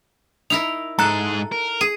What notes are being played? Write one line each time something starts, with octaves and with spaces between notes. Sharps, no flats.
D#4 E4 A#4 F7
G#2 G#4 A4 A5 A#5 F#6
A#4
G#4 D#7